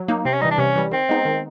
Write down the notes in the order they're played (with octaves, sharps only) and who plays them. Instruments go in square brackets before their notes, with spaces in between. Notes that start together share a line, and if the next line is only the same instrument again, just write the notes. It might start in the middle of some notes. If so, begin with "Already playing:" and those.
Already playing: [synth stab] F#3
A#3 D#4
[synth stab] C3 [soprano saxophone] C4
[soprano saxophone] C#4
[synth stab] E3 G3 [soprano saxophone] D#4
[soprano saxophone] D4
[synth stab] C3 [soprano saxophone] C#4
[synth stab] E3 G3
[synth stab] D#3 [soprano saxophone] C4
[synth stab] G#3 B3 D#4
D#3